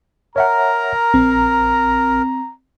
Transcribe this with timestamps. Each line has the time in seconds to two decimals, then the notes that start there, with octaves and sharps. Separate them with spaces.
0.36 A#4 C#5 E5 F#5 A#5
1.14 A#1 C4